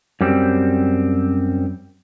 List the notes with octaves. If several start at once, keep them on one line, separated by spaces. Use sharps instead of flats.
F#2 G3 C4